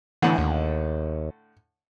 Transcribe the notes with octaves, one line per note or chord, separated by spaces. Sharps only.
A2 D3 E3
D#2